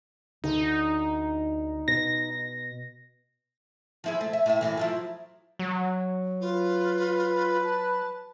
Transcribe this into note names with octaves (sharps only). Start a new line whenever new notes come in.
D2 D3 D#4
B2 A#6
F3 E4 G#4
A3
E5
A2 E5
F#2 A2 E3
F3 F#3 E4
F#3
F4 B4
A5